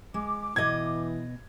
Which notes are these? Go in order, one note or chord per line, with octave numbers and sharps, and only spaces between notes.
G#3 D6
B2 E3 D#5 G#6